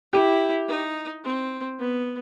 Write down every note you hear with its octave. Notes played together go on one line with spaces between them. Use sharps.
E4 G4
D#4
C4
B3